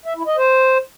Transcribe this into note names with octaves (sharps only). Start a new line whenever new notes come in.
E5
E4
D#5
C5